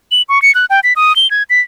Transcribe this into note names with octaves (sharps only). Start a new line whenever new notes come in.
F#7
C#6
C#7
F#6
G5
B6
D#6
G7
G#6
B6